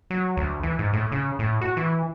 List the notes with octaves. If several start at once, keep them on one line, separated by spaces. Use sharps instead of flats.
F#3
D2
E3
G#2
A2
C#3
A2
F#4
E3